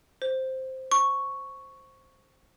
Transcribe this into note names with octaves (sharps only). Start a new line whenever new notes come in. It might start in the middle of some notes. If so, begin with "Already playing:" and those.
C5
C#6